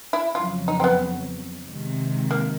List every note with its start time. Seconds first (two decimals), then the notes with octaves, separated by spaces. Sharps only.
0.13 E4
0.35 F2 C#3 F#3 F4
0.68 D#4
0.80 C4
0.84 B3
1.66 C3 D#3 G#3
2.31 A#3